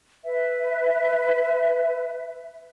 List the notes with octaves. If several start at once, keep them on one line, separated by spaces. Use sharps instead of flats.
B4 E5